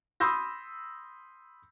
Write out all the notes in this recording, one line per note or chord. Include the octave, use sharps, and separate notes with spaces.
B5 C6 D#6 E6 G6 A#6